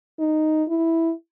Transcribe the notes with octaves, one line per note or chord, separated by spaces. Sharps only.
D#4
E4